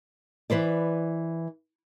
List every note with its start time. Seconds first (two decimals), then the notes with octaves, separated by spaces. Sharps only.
0.50 E3 B4 C5 D5